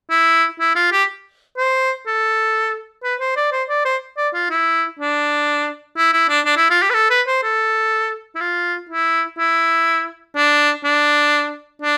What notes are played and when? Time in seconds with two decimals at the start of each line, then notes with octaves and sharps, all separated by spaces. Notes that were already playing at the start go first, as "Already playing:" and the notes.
0.10 E4
0.60 E4
0.76 F4
0.92 G4
1.57 C5
2.07 A4
3.03 B4
3.20 C5
3.36 D5
3.52 C5
3.69 D5
3.85 C5
4.17 D5
4.34 F4
4.50 E4
4.99 D4
5.96 E4
6.13 E4
6.29 D4
6.45 D4
6.57 E4
6.70 F4
6.82 G4
6.90 B4
6.94 A4
7.10 B4
7.27 C5
7.43 A4
8.35 E4
8.41 F4
8.89 E4
9.38 E4
10.36 D4
10.84 D4
11.82 D4